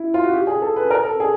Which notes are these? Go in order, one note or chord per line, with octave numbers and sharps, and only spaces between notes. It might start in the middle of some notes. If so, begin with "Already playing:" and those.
Already playing: E4
F4
F#4
G4
G#4
A4
B4
A#4
A4
G#4